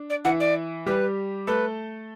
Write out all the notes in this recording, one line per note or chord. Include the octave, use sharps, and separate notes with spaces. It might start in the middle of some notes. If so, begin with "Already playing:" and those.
Already playing: D4
D5
E3 E4 F#5
D5
G3 G4 B4
A3 A4 B4